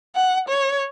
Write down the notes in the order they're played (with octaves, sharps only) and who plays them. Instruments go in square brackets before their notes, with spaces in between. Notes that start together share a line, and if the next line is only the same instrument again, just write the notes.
[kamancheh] F#5
C#5